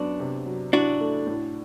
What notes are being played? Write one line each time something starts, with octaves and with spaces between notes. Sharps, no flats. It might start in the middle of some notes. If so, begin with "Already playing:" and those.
Already playing: F#2 B3 D4 F#4
C3
F#3
D4 E4 F#4
A3
A2